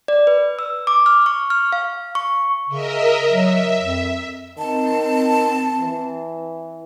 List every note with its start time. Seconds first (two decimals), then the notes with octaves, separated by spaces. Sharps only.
0.08 D5
0.27 B4
0.59 E6
0.87 D6
1.06 F6
1.26 C#6
1.50 F6
1.72 F5
2.15 C#6
2.69 C#3 A#4 D#5 E5
3.32 F#3 E5
3.79 F2
4.58 D#3 C4 A5
5.81 E3